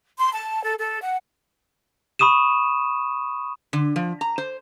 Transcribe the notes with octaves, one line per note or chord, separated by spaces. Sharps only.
C6
A5
A4
A4
F#5
B5 C#6 D#6 D#7 E7
D3
F3
A#5
C5